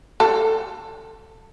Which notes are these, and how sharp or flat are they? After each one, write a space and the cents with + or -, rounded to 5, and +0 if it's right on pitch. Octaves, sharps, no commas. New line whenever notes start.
A4 +10